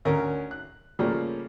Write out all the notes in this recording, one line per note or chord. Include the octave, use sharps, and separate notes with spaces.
D2 C#4 A#4
F#6
C#3 F3 G3 A3 A#3 C#4